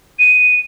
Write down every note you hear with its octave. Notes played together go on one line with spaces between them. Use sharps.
D#7